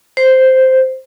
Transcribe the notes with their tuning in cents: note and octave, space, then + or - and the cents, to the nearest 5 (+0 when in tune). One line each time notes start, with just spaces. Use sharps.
C5 -5